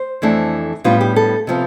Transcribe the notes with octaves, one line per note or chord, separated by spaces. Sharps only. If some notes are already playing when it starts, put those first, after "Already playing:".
Already playing: C5
F2 E3 A3 D4
A2 G3 B3 D4 F4
G4
A4
C3 F3 B3 F4